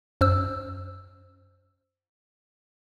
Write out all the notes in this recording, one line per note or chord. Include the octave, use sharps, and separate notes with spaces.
F#2 C5 E6